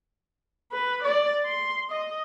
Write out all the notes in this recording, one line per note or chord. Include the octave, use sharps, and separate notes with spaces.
B4
D5
C6
D#5